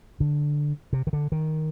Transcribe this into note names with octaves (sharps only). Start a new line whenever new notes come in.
D3
C3
D#3
D3
D#3